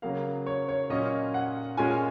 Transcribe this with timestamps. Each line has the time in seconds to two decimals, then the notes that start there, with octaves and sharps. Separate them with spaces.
0.02 C#3 F#3 A#3 F5
0.46 C#5
0.69 C#5
0.90 A#2 F#3 C#4 F4 D#5
1.34 F#5
1.77 A#2 G#3 C#4 F4 G#5